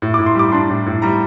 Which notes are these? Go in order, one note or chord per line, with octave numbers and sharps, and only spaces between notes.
A2
A2 D6
C6
G3 D6
D4 C6
A2
A2
G3 A#5